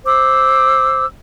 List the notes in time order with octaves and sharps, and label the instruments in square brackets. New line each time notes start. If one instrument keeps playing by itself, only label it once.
[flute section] C5 D6 E6